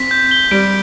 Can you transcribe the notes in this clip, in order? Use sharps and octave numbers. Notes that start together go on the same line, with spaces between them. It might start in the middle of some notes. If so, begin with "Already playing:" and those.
Already playing: C4 B6
G6
G7
G3 D7